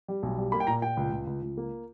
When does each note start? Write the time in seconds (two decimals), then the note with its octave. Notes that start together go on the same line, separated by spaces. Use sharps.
0.08 G3
0.23 B1
0.38 G3
0.52 A#3 B5
0.60 G5
0.67 A#2 A#5
0.82 A#2 G5
0.97 C#2
1.12 C#2
1.27 C#2
1.42 C#2
1.57 A#3